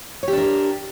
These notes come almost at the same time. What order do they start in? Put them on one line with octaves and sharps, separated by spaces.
C#5 G4 D4 A#4